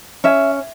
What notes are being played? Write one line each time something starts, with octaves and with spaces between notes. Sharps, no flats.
C#4 E5